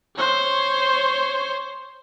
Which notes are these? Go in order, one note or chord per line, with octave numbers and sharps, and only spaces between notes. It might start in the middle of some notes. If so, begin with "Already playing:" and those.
C5 C#5